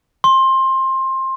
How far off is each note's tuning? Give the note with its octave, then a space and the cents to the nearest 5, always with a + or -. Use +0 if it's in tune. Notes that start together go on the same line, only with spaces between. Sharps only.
C6 +20